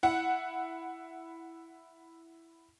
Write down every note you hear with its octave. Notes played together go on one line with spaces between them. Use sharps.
E4 F#5